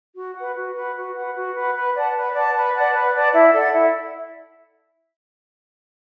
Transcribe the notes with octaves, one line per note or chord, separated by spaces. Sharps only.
F#4
B4 F#5
F#4
B4 F#5
F#4
B4 F#5
F#4
B4 F#5
B4
D5 F#5 A5
B4
D5 F#5 A5
B4
D5 F#5 A5
B4
D5 F#5 A5
E4
A4 D5 F#5
E4